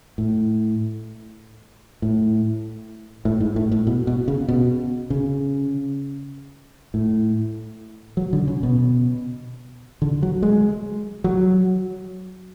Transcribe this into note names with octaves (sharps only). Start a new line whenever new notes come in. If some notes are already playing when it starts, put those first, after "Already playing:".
A2
A2
A2
G#2
A2
A2
B2
B2
C#3
B2
C#3
A2
F#3
D3
C#3
B2
D3
F#3
G#3
F#3